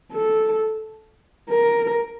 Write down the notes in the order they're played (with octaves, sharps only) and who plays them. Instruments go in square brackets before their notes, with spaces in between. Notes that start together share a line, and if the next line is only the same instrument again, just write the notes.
[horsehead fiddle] A4
A#4